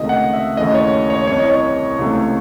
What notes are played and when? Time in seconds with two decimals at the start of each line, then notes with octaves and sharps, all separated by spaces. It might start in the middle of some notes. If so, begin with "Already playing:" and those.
Already playing: C#2 C3 D#3 A3 D#5
0.09 F#5
0.33 E5
0.57 D#2 C#3 E3 A3 D#5
0.74 C#5
1.10 C#5
1.27 C2 C3 E3 C#5
1.39 D#5
1.50 C#5
1.99 C#2 C3 E3 A3